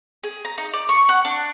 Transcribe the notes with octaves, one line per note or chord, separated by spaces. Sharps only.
G#4
A#5
D#4
D5
C#6
F#5
D4